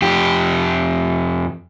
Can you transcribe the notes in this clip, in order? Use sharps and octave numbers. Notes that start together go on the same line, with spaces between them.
F2 G4